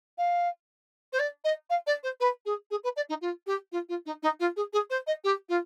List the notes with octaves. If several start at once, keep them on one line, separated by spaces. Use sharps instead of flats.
F5
C5
D5
D#5
F5
D5
C5
B4
G#4
G#4
B4
D5
D#4
F4
G4
F4
F4
D#4
D#4
F4
G#4
G#4
C5
D#5
G4
F4